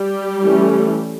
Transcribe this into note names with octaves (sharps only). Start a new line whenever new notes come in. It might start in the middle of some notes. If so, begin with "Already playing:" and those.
Already playing: G3 G4
E3 A3 C#4